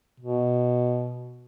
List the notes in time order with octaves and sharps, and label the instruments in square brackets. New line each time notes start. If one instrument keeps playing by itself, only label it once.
[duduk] B2